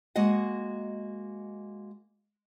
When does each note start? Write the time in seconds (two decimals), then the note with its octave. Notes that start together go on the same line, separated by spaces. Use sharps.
0.15 G#3 A#3 F#4 D#5 F#5